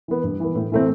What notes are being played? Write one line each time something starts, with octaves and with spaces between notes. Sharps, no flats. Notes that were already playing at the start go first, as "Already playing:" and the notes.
E3 B3
G2
E3 B3
A2
E3 A3 C4